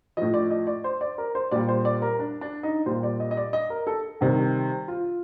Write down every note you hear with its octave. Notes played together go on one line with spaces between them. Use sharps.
A2 F3 D#5
D5
D#5
D5
C5
D5
A#4
C5
A#2 G3 D5
C5
D5
A#4
D4
D4
D#4
A#2 G3 C5
D5
D#5
D#5
D5
D#5
A#4
A4
C3 D#3 G3
F4